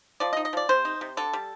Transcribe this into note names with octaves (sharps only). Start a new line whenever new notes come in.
F3 D5
D#5
D#4
D#5
F3 D5
C3 C5
D#4
C3
D3 A4
G3